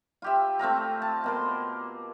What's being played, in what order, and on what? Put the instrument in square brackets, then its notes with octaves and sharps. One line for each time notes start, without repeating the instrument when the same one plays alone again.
[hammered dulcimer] F4 G4 E5
A3 C4 F4 A#5
A5
B2 A#3 C6